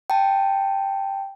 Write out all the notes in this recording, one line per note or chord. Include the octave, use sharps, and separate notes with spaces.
G5 A5